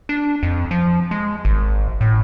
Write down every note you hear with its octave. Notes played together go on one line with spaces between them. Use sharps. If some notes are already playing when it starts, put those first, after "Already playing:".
D4
F2
F3
G#3
G#1
A2